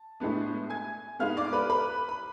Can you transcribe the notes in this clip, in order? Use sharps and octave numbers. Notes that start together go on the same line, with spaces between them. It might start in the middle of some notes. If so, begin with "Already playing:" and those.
Already playing: A5
A2 G#3 B3 D4
G#5 G#6
G#2 G#3 B3 F5 F6
D5 D6
B4 B5
B4 B5
B5